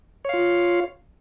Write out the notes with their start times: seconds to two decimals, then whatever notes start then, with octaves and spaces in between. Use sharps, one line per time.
0.25 C#5
0.29 F5
0.34 F4